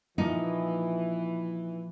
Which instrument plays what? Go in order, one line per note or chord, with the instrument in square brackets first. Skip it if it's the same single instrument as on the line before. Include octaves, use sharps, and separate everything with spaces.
[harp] A#2 F3 C#7 [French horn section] E3 [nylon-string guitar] D#4